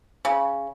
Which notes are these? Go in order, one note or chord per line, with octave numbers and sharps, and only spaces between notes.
C#3